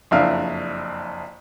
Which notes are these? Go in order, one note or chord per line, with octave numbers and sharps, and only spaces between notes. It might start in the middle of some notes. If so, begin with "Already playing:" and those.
F#1 F2 D4 E5 F5 F6